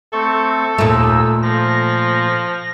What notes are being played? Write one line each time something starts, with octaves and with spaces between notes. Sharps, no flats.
A3 C4 A4 C#6
D#2 A#2 A3 D#4 E6
F3 A#6